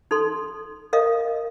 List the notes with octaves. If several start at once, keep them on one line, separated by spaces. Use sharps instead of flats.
D#4 A4 C6
A#4 D#5 F5 D#6